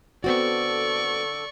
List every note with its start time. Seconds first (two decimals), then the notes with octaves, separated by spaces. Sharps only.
0.24 D3 B3 C4 F#4 A4 D5 C#6